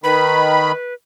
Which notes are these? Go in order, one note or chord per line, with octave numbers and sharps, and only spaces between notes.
D#3 B4 B5